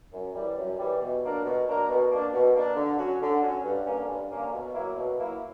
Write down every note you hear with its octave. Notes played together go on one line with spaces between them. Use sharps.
F#2
E3 G3
F#2
E3 G3
B2
F#3 A#3 D4 A#4
B2
F#3 A#3 D4 A#4
B2
A#3 D4
B2
A#3 D4
D3
F#3 C#4 F#4
D3
F#3 C#4 F#4
G2
D3 A#3 C#4
G2
D3 A#3 C#4
B2
F#3 A#3 E4
B2
F#3 A#3 E4